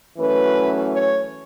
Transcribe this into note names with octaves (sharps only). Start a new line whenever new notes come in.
F#2 E3 A3 C#4 B4
C#5